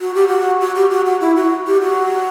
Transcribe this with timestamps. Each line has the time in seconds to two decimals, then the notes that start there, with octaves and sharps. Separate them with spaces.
0.01 F#4
0.15 G4
0.28 F#4
0.61 F#4
0.76 G4
0.90 F#4
1.06 F#4
1.21 E4
1.36 F#4
1.67 G4
1.81 F#4